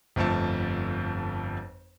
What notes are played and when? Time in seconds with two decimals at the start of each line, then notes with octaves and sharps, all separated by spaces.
0.16 G1 F2 F3 A3 A5